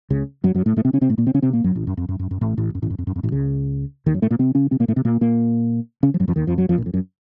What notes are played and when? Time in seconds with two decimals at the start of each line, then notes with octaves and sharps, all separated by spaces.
0.10 C#2 C#3
0.44 F#2 F#3
0.54 F#2 F#3
0.66 A2 A3
0.76 A2 A3
0.85 C3 C4
0.93 C#3 C#4
1.01 C3 C4
1.09 A2 A3
1.18 A#2 A#3
1.26 C3 C4
1.34 C#3 C#4
1.42 C3 C4
1.53 A#2 A#3
1.64 F#2 F#3
1.75 A1 A2
1.87 F#2
1.97 F2
2.09 F#2
2.19 F#2
2.31 F#2
2.41 A1 A2
2.58 A1 A2
2.75 F#2
2.82 A1 A2
2.90 F#2
2.98 F2
3.07 F#2
3.16 F2
3.23 A1 A2
3.32 C#2 C#3
4.06 D#2 D#3
4.14 F#2 F#3
4.22 A2 A3
4.31 A#2 A#3
4.39 C3 C4
4.55 C#3 C#4
4.71 C3 C4
4.80 A#2 A#3
4.88 A2 A3
4.96 C3 C4
5.05 A#2 A#3
5.21 A#2 A#3
6.03 C#3 C#4
6.14 F3
6.20 F#2 F#3
6.28 F2 F3
6.36 D#2 D#3
6.47 F2 F3
6.58 F#2 F#3
6.69 F2 F3
6.78 A#1 A#2
6.86 F2
6.94 F#2